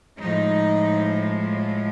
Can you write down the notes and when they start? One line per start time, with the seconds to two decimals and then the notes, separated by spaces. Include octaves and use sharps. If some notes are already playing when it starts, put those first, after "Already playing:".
0.18 A2 F3 G#3 D#4